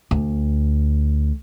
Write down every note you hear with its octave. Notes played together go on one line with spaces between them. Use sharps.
D2